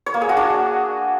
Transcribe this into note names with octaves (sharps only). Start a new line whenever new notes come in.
C#5
A#3
G#4
F#4
D4